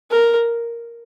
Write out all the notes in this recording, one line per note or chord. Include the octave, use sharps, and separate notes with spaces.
A#4